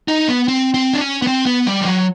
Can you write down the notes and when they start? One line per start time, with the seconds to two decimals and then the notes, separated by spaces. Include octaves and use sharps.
0.08 D#4
0.28 B3
0.48 C4
0.74 C4
0.93 D4
1.00 C#4
1.22 B3
1.27 C4
1.46 B3
1.67 G3
1.81 F3
1.86 F#3